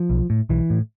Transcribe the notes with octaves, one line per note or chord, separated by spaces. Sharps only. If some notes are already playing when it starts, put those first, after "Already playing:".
Already playing: F3
B1
A2
B1 E3
A2